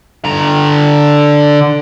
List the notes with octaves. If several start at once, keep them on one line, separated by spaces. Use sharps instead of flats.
D3 A#5